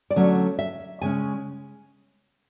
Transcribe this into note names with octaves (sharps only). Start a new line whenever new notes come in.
D5
D3 F#3 A3 C#4 C#5
E5
C#3 G#3 C#4 G#5